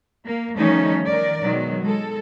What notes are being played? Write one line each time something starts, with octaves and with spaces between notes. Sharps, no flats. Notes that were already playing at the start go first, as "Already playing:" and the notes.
A#3
D#3 F3 G3 A3 C#4 D#4
D#3 A#4 D5
B2 D#3 F#3 G#3
G#3 A4